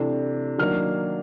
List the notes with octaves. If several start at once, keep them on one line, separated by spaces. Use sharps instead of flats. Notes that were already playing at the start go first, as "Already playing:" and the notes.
Already playing: C3 E3 A3 D4
D#3 F#3 A#3 D4 F6